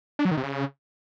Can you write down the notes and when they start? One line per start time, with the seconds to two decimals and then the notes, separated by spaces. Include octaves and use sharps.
0.19 D4
0.25 F#3
0.31 D#3
0.37 C3
0.43 C#3